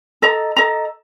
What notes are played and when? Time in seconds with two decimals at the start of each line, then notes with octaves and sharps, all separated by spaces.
0.22 A4 D#5 A#5
0.56 A4 D#5 A#5